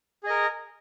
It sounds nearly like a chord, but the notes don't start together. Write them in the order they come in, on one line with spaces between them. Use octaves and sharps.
G#4 D#5 A#4